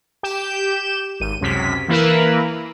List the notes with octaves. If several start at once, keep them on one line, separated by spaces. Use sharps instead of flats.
G4 G6 E7
G#1 D#7
C#2 F#2 C3 B6
E3 A#3 E4 A#4 B4